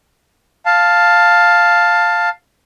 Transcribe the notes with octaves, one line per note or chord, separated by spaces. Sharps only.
F5 A5